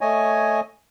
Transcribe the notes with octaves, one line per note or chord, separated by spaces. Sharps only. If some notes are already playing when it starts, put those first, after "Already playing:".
A3 C#5 D#5 G#5